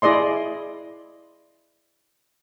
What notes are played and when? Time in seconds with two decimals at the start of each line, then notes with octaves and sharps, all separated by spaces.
0.02 E4 G#4 D5 D#5 C6